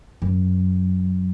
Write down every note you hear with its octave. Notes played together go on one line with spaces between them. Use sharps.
F#2